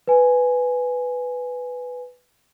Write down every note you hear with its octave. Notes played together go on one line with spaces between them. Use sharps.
B4 G#5